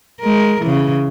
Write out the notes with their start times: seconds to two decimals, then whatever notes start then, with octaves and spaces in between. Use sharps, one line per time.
0.21 G#3 A#4
0.62 C#3 E3